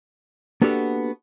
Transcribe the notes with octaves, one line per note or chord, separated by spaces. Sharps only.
A#3 B3 D4 F#4 G4 A4